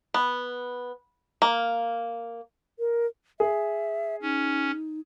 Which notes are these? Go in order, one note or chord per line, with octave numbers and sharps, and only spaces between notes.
B3
A#3
A#4
G#4 E5
C#4 D#4